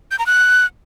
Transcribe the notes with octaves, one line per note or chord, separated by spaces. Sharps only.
G6
A#5
F#6